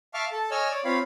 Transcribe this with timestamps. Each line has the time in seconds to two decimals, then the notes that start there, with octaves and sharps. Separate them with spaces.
0.14 E5 F5 A5 C#6 D6 F6
0.32 A4 A5
0.51 C#5 D#5 G#5 E6 F6
0.71 C#5 D5
0.85 C4 F4 C#5 F5 B5